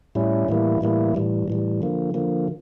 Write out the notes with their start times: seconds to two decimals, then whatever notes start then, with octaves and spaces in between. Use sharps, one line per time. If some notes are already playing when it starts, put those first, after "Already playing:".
0.15 A2 G3 C#4 E4
0.48 A2 E3 G3 A#3 E4
0.81 A2 E3 G3 A#3 E4
1.15 A2 E3 G3
1.48 A2 E3 G3
1.82 D3 F3 A#3
2.14 D3 F3 A#3